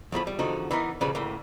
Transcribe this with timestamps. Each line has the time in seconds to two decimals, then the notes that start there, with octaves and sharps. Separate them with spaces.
0.12 E2 A2 F3 B5
0.27 G3
0.39 E2 D3 F3 D#4 F#4 A4
0.71 E3 B3 D#4 A#4
1.01 A#2 C#3 F3 G3 B4
1.15 D2 A2 A#3